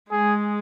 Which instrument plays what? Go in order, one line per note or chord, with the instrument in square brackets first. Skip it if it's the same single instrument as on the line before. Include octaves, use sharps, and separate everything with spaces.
[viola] G#3 [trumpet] G#4